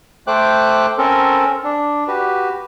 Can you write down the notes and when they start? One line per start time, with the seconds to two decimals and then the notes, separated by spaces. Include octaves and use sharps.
0.27 A3 C5 G5 D6 F#6
0.98 C4 C#4 A4 A#4
1.64 D4
2.08 F#4 G4 B4